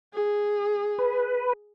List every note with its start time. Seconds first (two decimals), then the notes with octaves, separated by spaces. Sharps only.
0.14 G#4
0.99 B4